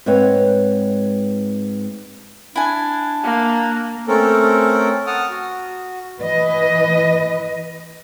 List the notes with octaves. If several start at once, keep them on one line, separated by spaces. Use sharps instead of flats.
G#2 G#3 C4 B4 C#5 F#5
D4 E4 G#5
A#3
A3 C4 C#4 A4 A#4
F#5 A5 D#6 F6
F#4
E3 B4 D#5